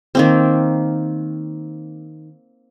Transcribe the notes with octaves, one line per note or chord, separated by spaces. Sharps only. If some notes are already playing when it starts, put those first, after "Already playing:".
D#3 A#3 C4